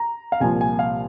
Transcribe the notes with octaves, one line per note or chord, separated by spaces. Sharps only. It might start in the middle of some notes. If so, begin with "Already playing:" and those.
Already playing: A#5
F5
C2 A#2 F3 G#5
G#5
F5